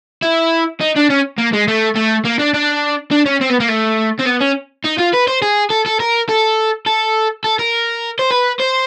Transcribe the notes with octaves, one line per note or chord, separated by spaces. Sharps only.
E4
D#4
D4
C#4
A#3
G#3
A3
A3
A#3
D4
D4
D4
C#4
C4
B3
A#3
A3
C4
B3
C#4
D#4
F4
B4
C5
G#4
A4
A4
A#4
A4
A4
A4
A#4
C5
B4
C5